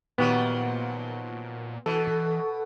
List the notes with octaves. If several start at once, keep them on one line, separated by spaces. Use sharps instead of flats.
A#2 D#3 F3 F#3 B3 G4 F#5
B2 E3 A4